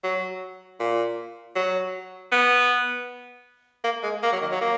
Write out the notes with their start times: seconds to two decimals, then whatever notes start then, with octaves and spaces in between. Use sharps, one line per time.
0.04 F#3
0.80 A#2
1.55 F#3
2.32 B3
3.84 A#3
4.03 G#3
4.23 A#3
4.32 F#3
4.41 D#3
4.52 F#3
4.61 A#3